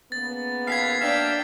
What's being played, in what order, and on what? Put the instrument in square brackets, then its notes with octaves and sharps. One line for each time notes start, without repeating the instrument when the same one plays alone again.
[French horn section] C#3 A#3 B3 [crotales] A6
[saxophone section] D#2 F5 [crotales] G#6 B6 C7
[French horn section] F#3 A#3 [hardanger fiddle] D4 G5 [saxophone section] E5 F5